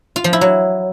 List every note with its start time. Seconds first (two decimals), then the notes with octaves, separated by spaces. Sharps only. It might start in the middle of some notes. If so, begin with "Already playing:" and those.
0.16 F4
0.24 F3
0.33 E4
0.41 F#3